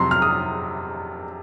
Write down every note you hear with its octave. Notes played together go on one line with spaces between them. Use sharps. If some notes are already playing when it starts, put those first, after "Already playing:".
Already playing: F2 C3 F#3 A#5 C6
F6
D#6